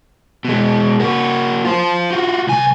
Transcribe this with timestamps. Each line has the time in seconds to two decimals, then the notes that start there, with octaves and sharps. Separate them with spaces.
0.45 B2 G#3
1.00 A#3 F#4
1.65 F4 C5
2.11 F4 F#4
2.47 C2 G#5